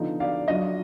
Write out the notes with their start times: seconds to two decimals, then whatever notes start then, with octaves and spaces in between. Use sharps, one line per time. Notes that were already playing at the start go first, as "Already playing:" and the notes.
Already playing: D3 F3 B3 D#4
0.20 D5 F5
0.48 F#3 D4 F4 D#5